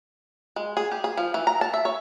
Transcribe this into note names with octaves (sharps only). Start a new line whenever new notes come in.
G#3
G#4
G4
G#4
F3
E3
A#5
A5
E5
C#5